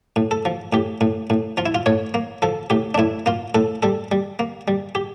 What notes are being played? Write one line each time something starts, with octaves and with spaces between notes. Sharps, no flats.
A2
A4
F3
A2 G4
A2
A2
F3 F4
E4
F4
A2 C#5
A#3
F3 A4
A2 G4
D4
A2 E4
A#3 F4
A2 A4
G3 A4
G3
A#3
G3
G4